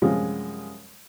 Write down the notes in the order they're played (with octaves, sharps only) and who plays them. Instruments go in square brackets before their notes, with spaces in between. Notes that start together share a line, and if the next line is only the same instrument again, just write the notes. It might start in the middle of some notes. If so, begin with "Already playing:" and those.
[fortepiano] F#2 C3 F3 G3 G#3